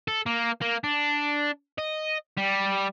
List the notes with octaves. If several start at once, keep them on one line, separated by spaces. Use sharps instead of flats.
A4
A#3
A#3
D4
D#5
G3